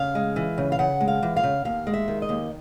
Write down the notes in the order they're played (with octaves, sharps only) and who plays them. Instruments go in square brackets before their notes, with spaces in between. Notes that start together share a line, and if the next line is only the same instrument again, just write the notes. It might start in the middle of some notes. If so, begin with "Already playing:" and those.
Already playing: [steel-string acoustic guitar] C#3 F5
G#3
E3
C#3
F5
C#3 F#5
G#3
F5
E3
F5
C#3
D#2 F5
G#3
E5
D#3
D#5
D#2